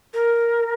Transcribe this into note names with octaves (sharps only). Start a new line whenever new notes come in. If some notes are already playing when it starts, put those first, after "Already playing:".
A#4